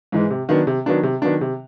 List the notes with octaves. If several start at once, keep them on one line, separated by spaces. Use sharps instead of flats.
G#2 E3 G#3
C3
D#3 F#3 B3 D4
C3
D#3 F#3 B3 D4
C3
D#3 F#3 B3 D4
C3